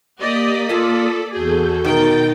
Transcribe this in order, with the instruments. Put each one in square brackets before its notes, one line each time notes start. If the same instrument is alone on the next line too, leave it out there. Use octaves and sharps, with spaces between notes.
[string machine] A#3 D#6 B6 [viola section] G4 D5 D#5
[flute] F4 [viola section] A4 D5 [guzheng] F5 G#5 A5
[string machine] E2 A4 G6 [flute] F#4 [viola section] G#4
[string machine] B2 D#4 A6 [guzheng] D#3 A#4 [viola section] G5